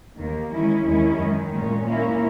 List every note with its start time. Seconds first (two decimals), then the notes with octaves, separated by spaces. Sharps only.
0.17 D#2 D#3 A#3
0.51 D#3 G#3 C#4 E4
0.84 D#2 D#3 G#3 C#4 E4
1.18 F#2 D#3 G#3
1.52 A#2 G#3 C#4
1.84 A#2 A#3 C#4 E4